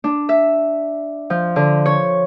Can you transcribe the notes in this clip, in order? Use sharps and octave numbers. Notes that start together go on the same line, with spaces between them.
D4
E5
F3
D3
C#5